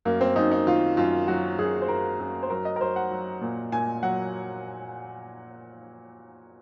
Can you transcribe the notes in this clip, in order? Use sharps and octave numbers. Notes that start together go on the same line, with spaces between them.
F#2 A#3
C4
F#2 D#4
D#4
D#3 F4
F#2 F4
F#3 F#4
F#2 G#4
C5
F#2 A#4
F#2
C5
F#3 A#4
D#5
A#4
F#3 C5
F#5
F#3
A#2
A#2 G#5
F#3 F#5